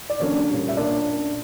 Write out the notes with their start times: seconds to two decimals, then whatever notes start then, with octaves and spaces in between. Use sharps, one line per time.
0.10 D5
0.19 D3 F#3 A#3 C#4 D4 C#5
0.49 A#2 G3 C#4
0.68 E5
0.77 A#2 A#3 C#4 D4 D5